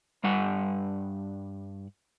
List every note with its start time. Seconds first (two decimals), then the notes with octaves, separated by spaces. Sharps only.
0.24 G2 G3 F#5